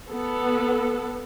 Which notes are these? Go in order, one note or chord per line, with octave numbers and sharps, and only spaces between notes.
B3 A4